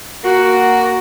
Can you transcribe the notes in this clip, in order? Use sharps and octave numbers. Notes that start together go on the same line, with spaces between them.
A#3 F#4